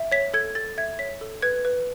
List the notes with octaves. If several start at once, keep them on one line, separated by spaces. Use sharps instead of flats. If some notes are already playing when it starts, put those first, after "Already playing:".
Already playing: E5
C#5 B6
A4 G#6
A4 A6
E5 G#6
C#5 B6
A4
B4 G#6
B4